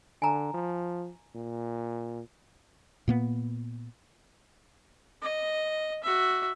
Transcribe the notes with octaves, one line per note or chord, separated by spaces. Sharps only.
D3 G#5 A#5
F3
A#2
A#2 A#3 B3
D#5
F#4 E5